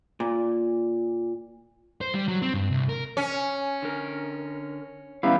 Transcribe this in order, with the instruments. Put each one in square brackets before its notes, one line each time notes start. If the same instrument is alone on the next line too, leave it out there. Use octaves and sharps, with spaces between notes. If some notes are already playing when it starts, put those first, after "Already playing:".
[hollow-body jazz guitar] A#2
[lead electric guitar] C5
G3
F#3
C4
G2
C2
A#4
[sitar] C#4
[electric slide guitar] D3 A#4
[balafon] E3 C#4 E5 [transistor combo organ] G3 B3 E4 [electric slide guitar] F5